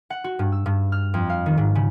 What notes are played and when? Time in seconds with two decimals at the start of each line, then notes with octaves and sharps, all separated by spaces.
0.10 F#5
0.24 F#4
0.39 G2
0.52 E6
0.66 G2
0.92 F6
1.14 F2
1.30 F5
1.46 D#3
1.57 G#2
1.75 C#3